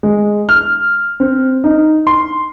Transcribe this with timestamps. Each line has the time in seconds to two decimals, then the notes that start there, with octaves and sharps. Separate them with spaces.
0.03 G#3
0.49 F6
1.20 C4
1.64 D#4
2.07 C6